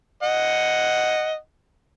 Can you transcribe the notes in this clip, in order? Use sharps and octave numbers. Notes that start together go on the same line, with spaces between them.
D#5 F#5